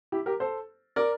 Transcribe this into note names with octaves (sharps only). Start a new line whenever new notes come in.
E4 G4
G4 A#4
A4 C5
A#4 D5